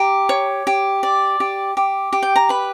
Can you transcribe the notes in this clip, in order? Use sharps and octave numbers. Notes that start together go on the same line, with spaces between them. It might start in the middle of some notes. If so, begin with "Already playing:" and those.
Already playing: G4 A#5
C#5
G4
D5
G4
G4
G4
G5
A#5
B4 B5